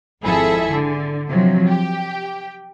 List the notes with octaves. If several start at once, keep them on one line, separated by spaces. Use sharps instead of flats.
G#1 F2 E4 G#4 A4 E5
D3
C3 F3 F#3
G4 G5